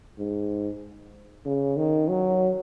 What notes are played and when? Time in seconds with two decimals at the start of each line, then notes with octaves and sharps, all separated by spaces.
0.19 G#2
1.45 C#3
1.77 D#3
2.08 F#3